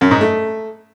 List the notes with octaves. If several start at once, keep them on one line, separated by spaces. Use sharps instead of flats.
F#2
G#2
A3